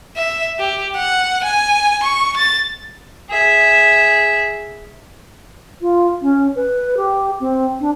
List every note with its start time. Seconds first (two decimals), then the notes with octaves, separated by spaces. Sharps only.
0.17 E5
0.59 G4
0.97 F#5
1.44 G#5
2.03 C#6
2.37 A6
3.30 G#4 E5
5.81 F4
6.21 C#4
6.55 B4
6.97 G4
7.40 C4
7.80 D4